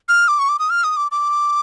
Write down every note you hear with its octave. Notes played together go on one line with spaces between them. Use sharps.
F6
D6
C#6
D6
D#6
F6
D#6
D6
D6